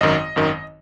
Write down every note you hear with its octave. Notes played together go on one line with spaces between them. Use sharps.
G#1 F#2 D#3 D#5
G#1 F#2 D#3